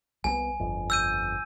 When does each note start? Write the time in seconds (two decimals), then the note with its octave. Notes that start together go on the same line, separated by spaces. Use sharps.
0.24 C2 G3 B3 G#5
0.59 G1 F2
0.90 E6 G6 D#7